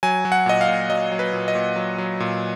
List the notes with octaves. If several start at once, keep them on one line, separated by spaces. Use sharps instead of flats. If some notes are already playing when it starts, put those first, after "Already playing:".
F#3 G#5
F#3
F#5
A#2 D#5
F5
A#2
F#3 D#5
F#3
B4
A#2
D#5
A#2
F#3
F#3
A#2